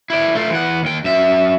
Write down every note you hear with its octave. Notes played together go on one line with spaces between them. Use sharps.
E4 D5
A3 F4
E3 F#5
D#2 G5
F#2 E5